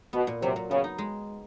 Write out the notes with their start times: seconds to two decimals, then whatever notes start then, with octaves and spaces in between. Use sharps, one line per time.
0.13 B2 B3
0.27 A#2
0.42 C3 F#3
0.56 A#2
0.71 C#3 B3
0.84 D#4
0.98 G#3